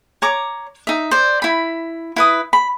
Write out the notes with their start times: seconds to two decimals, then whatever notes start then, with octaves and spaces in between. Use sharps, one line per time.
0.22 C#5 A#5 D6
0.87 D#4 E5
1.11 C5 D5
1.42 E4 B5
2.16 E4 B4 D#6
2.53 B5